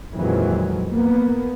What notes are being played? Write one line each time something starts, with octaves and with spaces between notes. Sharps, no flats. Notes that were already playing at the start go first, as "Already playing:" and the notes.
F2 A#2 D#3 E3 F#3 G#3
A#3 B3